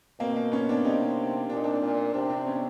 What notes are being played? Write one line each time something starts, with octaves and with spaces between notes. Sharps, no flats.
B2 A#3 C4
A#3 C4
B3 C#4
C4 D4
C3 C#4 D#4
A#2 D4
D#4
C4 D4
A#2
C3 C4 D4
C4 D4
B3 C#4